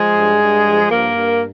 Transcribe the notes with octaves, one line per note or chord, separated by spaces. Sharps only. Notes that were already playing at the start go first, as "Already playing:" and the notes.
Already playing: F3 G#3 G#4
G2
G2
F3
G2 A#3 A#4
G2